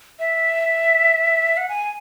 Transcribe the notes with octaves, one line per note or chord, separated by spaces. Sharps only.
E5
F#5
G#5